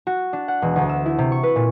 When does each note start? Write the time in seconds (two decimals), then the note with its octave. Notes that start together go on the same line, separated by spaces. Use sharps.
0.07 F#4
0.33 D4
0.48 F#5
0.62 E1
0.76 D2
0.89 E6
1.06 E4
1.19 C3
1.32 C#6
1.43 B4
1.56 A#2